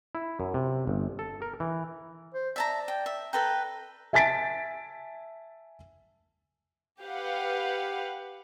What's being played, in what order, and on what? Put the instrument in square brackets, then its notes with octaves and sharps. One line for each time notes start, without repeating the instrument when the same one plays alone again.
[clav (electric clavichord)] E4
F#2
C3
G1
A4
A#4
E3
[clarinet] C5
[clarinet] D5 [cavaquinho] E5 A5 A#5
[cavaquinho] G5
E5
[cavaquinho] A4 B4 G5 [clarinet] A#5
[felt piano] E5 G#5 A5 A6 B6 D7
[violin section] G4 B4 F5 F#5